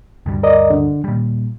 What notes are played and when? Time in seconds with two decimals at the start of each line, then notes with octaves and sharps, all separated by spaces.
0.26 D2 G2 G3
0.43 A#4 D5 D#5
0.70 D3
1.04 D#2 A#2 G3